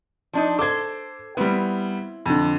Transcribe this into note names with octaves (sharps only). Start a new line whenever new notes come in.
F3 D4 D#4
A4 C5 D6 G#6
G3 B3 C4 E4
F2 D3